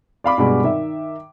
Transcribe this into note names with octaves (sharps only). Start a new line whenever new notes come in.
D5 F5 B5 D6
G2 B2 G#3 B5
D#3 E5